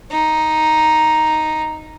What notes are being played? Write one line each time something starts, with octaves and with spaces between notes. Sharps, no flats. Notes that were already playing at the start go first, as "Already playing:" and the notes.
D#4